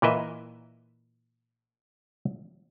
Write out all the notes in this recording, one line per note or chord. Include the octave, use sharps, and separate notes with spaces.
A#2 E3 A#4 B4 D#5 E5